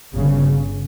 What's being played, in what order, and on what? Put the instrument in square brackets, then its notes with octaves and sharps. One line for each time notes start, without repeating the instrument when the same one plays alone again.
[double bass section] G1 C#3